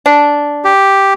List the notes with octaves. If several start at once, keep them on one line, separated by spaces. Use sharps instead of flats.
D4
G4